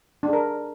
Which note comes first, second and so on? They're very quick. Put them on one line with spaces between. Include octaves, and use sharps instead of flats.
D4 G#4 A#4